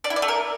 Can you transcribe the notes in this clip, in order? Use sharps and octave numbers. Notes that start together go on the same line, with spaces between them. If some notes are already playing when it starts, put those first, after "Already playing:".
D5
E4
D5
A3
A#4